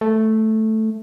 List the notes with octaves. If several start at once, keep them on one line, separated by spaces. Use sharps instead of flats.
A3